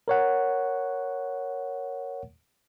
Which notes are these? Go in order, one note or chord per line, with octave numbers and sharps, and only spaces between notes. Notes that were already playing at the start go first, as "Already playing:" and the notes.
A#4 C#5 F#5